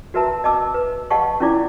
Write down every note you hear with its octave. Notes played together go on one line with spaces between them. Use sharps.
F#4 A#4 B4 E5 A5 A#5
D#5 A5 D6 E6
B4
G4 D#5 F5 F#5 A5 C#6
C#4 D4 E4 F4 D5 D6